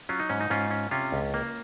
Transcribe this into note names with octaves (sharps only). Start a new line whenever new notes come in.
F#3 C#4 F4
D#4
G#2 C#4
D#4
G#2 C#4 F4
C#4
C3 C#4 F4
C#2
A#3